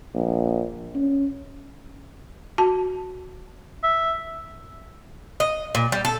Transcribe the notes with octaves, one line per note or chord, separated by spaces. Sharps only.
A#1
C#4
F#4 A5
E5
D#5
A#2
G3
A4